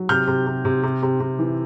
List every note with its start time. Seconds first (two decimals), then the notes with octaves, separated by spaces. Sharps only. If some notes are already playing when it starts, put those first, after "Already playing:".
Already playing: F#3
0.09 C3 F6 G6
0.28 C3
0.47 C3
0.65 C3
0.83 C3
1.03 C3
1.20 C3
1.39 E3